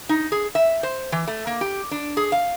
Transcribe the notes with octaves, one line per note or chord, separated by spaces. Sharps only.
D#4
G#4
E5
C5
E3
A3
A#3
G4
D4
G#4
F5